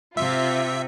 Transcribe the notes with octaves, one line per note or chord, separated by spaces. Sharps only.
C3 F4 E5